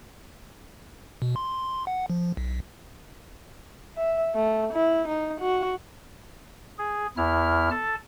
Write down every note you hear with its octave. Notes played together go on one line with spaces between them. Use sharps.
B2
C6
F#5
F3
B1
E5
A3
E4
D#4
F#4
G#4
E2 E4 F6
A4 A5